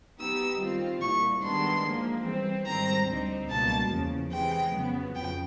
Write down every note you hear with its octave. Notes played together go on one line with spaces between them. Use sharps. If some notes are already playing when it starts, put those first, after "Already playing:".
F#3 B3 D#4 G4 E6
D#3 G3 C4 F4
C2 A#2 G3 C#6
G2 D#3 G#3 B3 D4 C6
G#2 F3 A#3
E3 G3 C4
G#2 D#3 G3 C4 A#5
D2 D3 G3 C4 D#4
C#2 B2 G3 A#3 A5
E2 C#3 F3
C3 E3 G#3 G5
F2 C#3 F#3 B3
F2 C#3 G5